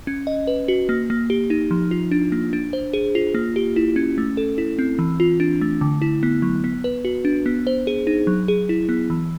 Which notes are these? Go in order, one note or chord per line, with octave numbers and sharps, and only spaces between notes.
C#4
D#5
B4
F#4
A#3
A#3
G4
D#4
F3
F4
D4
A#3
D4
C5
G#4
F4
A#3
G4
E4
C#4
A3
A4
E4
C4
E3
F4
D4
A3
D3
E4
B3
F#3
B3
B4
F#4
D4
B3
C5
G#4
D#4
F#3
G#4
E4
B3
E3